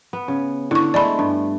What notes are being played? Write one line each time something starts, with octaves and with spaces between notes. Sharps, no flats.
B3
C#3
D3 E4 C#6
G#3 A3 D5 B5
G2